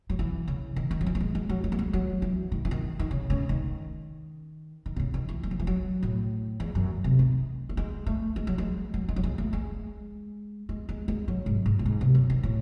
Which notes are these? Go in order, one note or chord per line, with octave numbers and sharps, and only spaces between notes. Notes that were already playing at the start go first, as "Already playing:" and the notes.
F#3
E3
C#3
D#3
D#3
F#3
E3
A3
G#3
G#3
F#3
G#3
A3
G#3
F#3
E3
D#3
E3
D#3
D#3
C#3
C#3
D#3
D#3
C3
C#3
D#3
E3
G#3
F#3
E3
F#3
A2
E2
F#2
C3
D#3
A3
G#3
A3
G#3
F#3
G#3
F#3
G#3
F#3
G#3
A3
G#3
G#3
G#3
G#3
F#3
G#2
G#2
A2
G#2
C3
F#2
D#3
A2